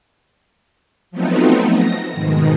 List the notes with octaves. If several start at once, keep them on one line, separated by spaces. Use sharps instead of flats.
F3 F#3 A3 B3 C4 D#4
A#6
G#2 B2 D#3